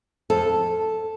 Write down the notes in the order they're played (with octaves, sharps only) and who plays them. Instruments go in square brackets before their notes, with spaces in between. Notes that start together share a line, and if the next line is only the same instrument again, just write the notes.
[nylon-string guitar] F2 A4